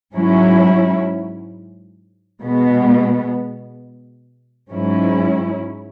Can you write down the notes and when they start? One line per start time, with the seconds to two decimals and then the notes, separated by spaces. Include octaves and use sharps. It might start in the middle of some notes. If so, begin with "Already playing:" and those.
0.14 G#2 F#3 C#4 E4
2.43 B2 G#3 B3
4.72 G#2 F#3 C#4 E4